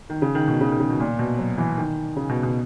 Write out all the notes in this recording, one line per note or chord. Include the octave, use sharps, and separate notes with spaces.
D#3
C#3
D#3
B2
C#3
D#3
C#3
B2
A#2
B2
F#3
E3
D#3
C#3
B2
B2